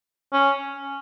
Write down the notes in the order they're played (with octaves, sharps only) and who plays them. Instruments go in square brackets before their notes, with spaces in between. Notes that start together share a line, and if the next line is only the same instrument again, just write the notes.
[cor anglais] C#4